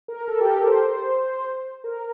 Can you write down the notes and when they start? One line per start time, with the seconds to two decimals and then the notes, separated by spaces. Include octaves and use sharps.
0.08 A#4
0.28 A4
0.41 G4
0.54 A#4
0.67 C5
1.84 A#4